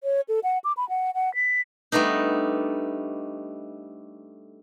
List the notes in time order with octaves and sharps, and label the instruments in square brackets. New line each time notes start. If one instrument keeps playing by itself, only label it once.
[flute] C#5
A4
F#5
D6
B5
F#5
F#5
B6
[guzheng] G3 A3 B3 D4 D#4